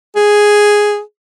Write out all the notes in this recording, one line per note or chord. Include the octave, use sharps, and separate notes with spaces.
G#4